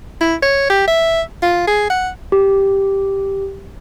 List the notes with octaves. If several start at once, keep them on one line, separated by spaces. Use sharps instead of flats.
E4
C#5
G4
E5
F4
G#4
F#5
G4